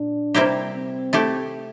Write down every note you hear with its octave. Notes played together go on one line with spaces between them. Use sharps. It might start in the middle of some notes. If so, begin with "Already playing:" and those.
Already playing: A#2 D4
C3 G3 A#3 E4 G4
C4
A3 E4 G4